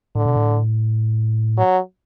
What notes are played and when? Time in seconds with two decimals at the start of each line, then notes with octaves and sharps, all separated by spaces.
0.15 A2 D3
0.25 B2
0.36 A2
1.57 F#3